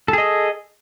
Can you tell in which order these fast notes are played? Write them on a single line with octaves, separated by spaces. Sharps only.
A4 G#4 D#5